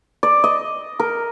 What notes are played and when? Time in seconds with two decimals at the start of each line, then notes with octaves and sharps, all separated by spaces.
0.23 D5
0.44 D#5
1.00 A#4